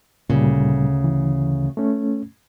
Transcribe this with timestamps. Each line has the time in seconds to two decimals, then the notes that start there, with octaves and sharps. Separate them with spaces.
0.29 D2 A#2 C#3 G3
1.04 E3
1.77 A3 C#4